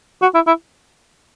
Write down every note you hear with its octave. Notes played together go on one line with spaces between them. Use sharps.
F#4
E4
E4